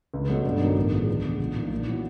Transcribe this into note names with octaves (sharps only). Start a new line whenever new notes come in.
C#2
B2 F#3 A3
G2
D#3 F#3 B3 D#4
A1
G#2 F3 G#3
D2
C#3 E3 G#3 B3
A#1
A#2 F3 A#3 D#4
A#2
F#3 B3 E4